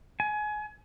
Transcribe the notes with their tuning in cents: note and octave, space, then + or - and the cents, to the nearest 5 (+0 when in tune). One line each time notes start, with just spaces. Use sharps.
G#5 +25